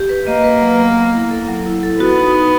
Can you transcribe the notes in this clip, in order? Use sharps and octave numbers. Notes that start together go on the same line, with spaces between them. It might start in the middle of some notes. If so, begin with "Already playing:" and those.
Already playing: G4
B4
A#3 D#5
B4
F#3
B3
B3
E4
A4
F#3
E4
A4
B3 F#4
D#4
D#4